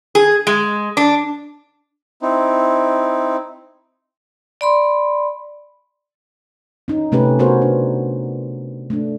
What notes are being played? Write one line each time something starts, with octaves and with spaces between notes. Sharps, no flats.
G#4
G#3
D4
C4 D#4 E4
D5 B5 C6
C#4 D#4
C3 A3 C#4 G4 B4
B3 F#4 A#4 C5 C#5
D4
A3 D4